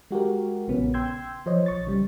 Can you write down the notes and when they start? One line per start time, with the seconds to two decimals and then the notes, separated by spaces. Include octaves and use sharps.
0.11 G#3 F#4 G4 A#4
0.68 A#1 C#3 B3 C#4
0.94 G5 C6 E6 G6 G#6
1.46 F3 C5 C#5 D#5
1.66 A#1 C#6 A6
1.87 C#3 G3